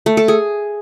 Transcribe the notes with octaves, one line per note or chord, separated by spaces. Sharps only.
A3
A4
G#4